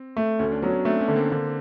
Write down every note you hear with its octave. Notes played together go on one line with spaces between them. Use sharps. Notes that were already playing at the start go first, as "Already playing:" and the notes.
Already playing: C4
A3
D2 C#4
D4
F#3 B3 C#4
A3 C4 D4
B3 C#4
D3
A#3 C4
D3 A#3 C4